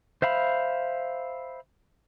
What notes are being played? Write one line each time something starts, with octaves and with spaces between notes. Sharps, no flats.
C5 E5 F5 B5